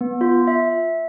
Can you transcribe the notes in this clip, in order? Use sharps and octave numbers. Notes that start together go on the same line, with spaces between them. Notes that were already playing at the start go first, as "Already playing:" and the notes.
B3
F4
E5